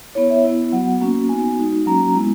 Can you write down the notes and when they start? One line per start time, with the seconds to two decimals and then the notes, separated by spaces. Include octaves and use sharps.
0.15 B3 E4 C#5
0.30 E5
0.44 B3 E4
0.72 F#3 B3 F#4 F#5
1.01 A#3 C#4 F#4
1.29 B3 D#4 F#4 G#5
1.58 G#3 D#4 F#4
1.86 F#3 A#3 C#4 F#4 A#5
2.15 G#3 B3 E4